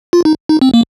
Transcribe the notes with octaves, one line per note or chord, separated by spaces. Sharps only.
F4
D#4
D#4
C4
A#3